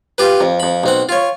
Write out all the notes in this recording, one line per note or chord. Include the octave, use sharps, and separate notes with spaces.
F4 G4 B4
F2
F2 B5
B1 C4 F#5
F4 C#5